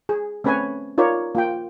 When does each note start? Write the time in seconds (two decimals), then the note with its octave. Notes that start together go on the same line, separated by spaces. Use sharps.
0.09 G#4
0.44 A3 C4 C#4 B4 C#5 G#5
0.98 D#4 F4 A#4 C#5 D5
1.35 A#3 F4 G5